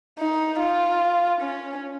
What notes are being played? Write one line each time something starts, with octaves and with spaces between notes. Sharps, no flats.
D#4
F4
C#4